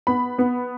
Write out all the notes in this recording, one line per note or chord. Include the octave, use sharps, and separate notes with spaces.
B3 B5
B3